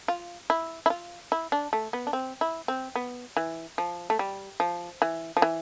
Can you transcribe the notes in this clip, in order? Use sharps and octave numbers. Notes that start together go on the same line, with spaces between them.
F4
E4
E4
F4
E4
D4
A3
B3
D4
C4
E4
C4
B3
E3
F3
A3
G3
F3
E3
F3
E3